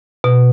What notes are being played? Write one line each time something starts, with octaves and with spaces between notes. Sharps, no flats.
B2